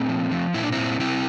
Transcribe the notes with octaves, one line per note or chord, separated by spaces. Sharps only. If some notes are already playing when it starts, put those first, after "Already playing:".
Already playing: A#2 A3 C4
F3
F3
A#2 E4
D4
A#2 C4 E4
C3 C4 E4